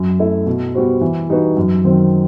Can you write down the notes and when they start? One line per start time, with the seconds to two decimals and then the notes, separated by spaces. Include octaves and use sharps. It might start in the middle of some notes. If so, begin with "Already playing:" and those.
Already playing: F#2
0.19 F#3 A3 E4
0.46 B2
0.75 G3 B3 F#4 C5
1.01 E3
1.29 G3 D#4 F#4 B4
1.57 F#2
1.84 D#3 F#3 C4